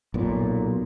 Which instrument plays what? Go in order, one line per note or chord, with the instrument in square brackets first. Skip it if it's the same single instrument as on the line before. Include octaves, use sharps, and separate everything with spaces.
[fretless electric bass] B1 A#2